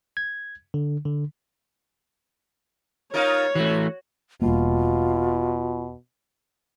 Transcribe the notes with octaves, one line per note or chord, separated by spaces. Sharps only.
G#6
D3
D3
D#4 F4 A#4 C#5
E3 A3 F#4
E1 B2 G3 A#3 F4